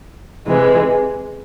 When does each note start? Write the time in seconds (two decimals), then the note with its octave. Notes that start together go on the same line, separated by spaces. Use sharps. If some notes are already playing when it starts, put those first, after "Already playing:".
0.46 C3 E3 G#3